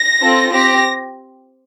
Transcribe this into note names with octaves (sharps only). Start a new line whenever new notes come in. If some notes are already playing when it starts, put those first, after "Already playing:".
Already playing: A#6
C4 F4 A4
C4 G4 A#6